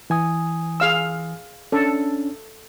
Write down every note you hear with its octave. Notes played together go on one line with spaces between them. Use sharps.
E3 G#5 D#6
G#4 F5 E6
C#4 D4 A4